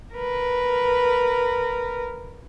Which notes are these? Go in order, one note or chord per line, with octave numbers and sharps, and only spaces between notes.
A#4 B4